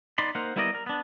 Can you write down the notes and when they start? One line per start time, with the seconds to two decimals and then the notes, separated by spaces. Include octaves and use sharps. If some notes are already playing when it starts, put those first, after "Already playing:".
0.18 B3 D#4 D5 B5 C6
0.35 A#3 D#4 C5 F5 F#5
0.56 G3 B3 E4 A#4 D5 D#5
0.75 A#4
0.86 B3 D4